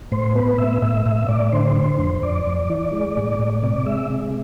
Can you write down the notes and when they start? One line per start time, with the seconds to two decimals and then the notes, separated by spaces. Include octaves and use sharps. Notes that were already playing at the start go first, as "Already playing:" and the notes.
0.12 A2 C5
0.35 B3 B4
0.58 A2 E5
0.82 A2 E5
1.06 A2 E5
1.28 A2 D5
1.52 D3 C5
1.76 D3 C5
1.99 F2 C5
2.22 F2 D5
2.46 F2
2.69 E3
2.93 G#3
3.17 A2
3.39 A2
3.63 C3 D5
3.86 G#3 E5
4.10 C3